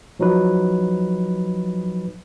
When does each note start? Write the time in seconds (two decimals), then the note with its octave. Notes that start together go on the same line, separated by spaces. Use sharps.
0.19 F3 F#3 D#4 B4